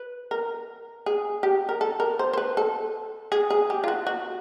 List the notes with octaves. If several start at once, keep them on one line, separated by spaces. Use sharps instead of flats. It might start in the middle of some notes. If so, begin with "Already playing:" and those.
Already playing: B4
A#4
G#4
G4
A#4
A4
A#4
C5
C5
B4
A4
G#4
G#4
G4
F4
F#4
F#4